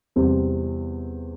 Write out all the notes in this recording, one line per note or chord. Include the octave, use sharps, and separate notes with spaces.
E2 C3 G3 C4